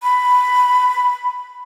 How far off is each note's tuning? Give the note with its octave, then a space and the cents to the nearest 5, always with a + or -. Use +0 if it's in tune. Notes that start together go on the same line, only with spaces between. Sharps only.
B5 +10